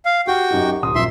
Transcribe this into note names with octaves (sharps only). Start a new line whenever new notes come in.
F5
F#4 G4 G5
F#2 D#4 G4
D#1 C6 D#6
A#1 F#2 E5 C6